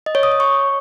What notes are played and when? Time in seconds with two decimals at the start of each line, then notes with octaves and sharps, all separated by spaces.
0.06 D#5
0.15 C#5
0.23 D#6
0.32 C#5
0.40 C#6